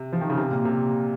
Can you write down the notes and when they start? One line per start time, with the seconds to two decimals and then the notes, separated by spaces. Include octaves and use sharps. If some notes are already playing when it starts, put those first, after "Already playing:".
Already playing: C3
0.13 F3
0.21 D#3
0.30 C#3
0.37 C3
0.51 A#2
0.65 C3